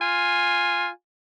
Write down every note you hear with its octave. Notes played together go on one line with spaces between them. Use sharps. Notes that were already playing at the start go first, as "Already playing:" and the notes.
F4 G#5